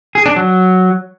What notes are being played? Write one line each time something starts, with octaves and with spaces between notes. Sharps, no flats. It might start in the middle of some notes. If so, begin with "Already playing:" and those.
G#4
D4
F#3